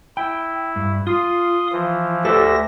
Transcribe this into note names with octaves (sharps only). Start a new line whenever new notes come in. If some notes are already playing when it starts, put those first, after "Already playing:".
E4 G5
G2
F4 C6 D#6
E3 F3
D2 G4 A4 B4 E5 A#6